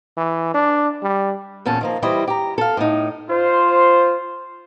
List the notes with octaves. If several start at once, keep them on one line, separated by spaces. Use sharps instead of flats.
E3
D4
G3
E2 A#2 C#4 A5
D#3 F3 A#3
E3 G3 E4 C5 D#5
G4 A#5
A4 F5
A2 D#4
F4 C5